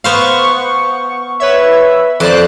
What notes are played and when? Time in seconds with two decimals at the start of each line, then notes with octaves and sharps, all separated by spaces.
0.04 B3 C5 F5 C#6
1.40 B4 C#5 E5
2.20 F2 C5 D5 F#6